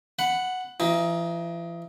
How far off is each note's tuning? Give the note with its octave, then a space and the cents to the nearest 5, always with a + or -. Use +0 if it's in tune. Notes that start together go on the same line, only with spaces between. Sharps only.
F#5 +0 B5 +20
E3 +45 D#4 +15